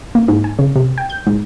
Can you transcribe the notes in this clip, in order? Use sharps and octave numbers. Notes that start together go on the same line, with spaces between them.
A#3
G#2
G#5
C#3
C3
G5
G6
G#2